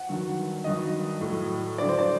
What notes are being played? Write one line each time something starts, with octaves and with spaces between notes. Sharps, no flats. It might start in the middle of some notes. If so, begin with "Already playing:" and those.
Already playing: F#5
G2 D#3 F#3
G2 D#3 F#3 D#5
A2 F#3
G2 D3 F#3 D5
C5
D5